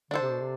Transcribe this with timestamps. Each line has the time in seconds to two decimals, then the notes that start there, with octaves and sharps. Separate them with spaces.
0.11 D3 D4 A4 C5
0.21 C3
0.31 B2
0.40 C3